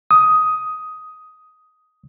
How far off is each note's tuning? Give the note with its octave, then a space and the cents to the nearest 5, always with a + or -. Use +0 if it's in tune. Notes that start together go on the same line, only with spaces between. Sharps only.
D#6 +10